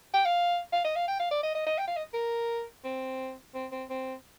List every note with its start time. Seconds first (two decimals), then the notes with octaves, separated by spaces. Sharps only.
0.14 G5
0.25 F5
0.73 F5
0.84 D#5
0.96 F5
1.08 G5
1.19 F5
1.31 D5
1.43 D#5
1.55 D#5
1.67 D#5
1.78 G5
1.87 F5
1.96 D#5
2.14 A#4
2.84 C4
3.54 C4
3.72 C4
3.89 C4